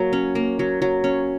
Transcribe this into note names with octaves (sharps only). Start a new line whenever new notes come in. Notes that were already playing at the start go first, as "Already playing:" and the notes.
Already playing: F#3 A#3
C#4
A#3
F#3
F#3
C#4